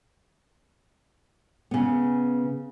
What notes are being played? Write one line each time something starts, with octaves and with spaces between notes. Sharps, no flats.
C#3 B3